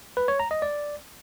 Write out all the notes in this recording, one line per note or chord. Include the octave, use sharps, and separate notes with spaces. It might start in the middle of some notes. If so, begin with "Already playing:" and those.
B4
C#5
A#5
D#5
D5